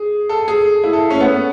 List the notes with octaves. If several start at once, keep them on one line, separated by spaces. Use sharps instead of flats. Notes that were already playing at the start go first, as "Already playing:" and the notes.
Already playing: G#4
A4
G#4
E4
A4
C#4
B3